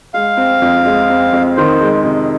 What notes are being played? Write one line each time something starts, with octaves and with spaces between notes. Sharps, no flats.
G#3 F5
C4
F2
G#3
C4
F2
D#3 C5
G#3
C3